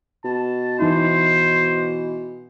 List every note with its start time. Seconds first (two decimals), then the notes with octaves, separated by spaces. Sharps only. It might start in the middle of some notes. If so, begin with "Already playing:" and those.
0.25 B2 A5
0.79 E3 D#4 E4 C5